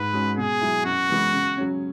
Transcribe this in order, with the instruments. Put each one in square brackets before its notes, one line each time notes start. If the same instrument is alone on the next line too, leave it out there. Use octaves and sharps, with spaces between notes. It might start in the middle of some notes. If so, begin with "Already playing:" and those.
Already playing: [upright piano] G#2 [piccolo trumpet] B4
[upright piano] G#3 C#4 F#4
[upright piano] B2 [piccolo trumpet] G#4
[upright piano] F#3 E4
[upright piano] F#2 [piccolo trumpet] F#4
[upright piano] E3 G#3 B3
C#3
F#3 C#4